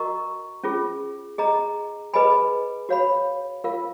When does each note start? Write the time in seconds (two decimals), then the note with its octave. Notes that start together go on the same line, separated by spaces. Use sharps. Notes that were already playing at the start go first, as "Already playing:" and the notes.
Already playing: F#4 A#4 D#5 A#5 C#6
0.63 C#4 F4 G#4
1.38 G#4 D#5 A#5
2.14 G#4 B4 D#5 G#5 B5
2.89 F#4 C#5 F5 B5
3.64 F4 A#4 F5